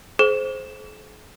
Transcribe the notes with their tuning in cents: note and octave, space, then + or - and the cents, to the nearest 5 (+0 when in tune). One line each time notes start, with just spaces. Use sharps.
G#4 +45 C5 +0